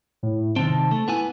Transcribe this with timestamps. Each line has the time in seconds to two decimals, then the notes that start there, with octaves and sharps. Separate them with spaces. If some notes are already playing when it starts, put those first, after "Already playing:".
0.23 A2
0.56 C3 D#3 C4 A5
0.91 A3
1.08 B3 E4 G#5